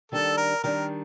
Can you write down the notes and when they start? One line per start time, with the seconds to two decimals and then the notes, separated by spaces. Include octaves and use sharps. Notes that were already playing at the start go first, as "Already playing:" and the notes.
0.12 D#3 G3 D4 A4
0.37 A#4
0.63 D#3 G3 D4 A#4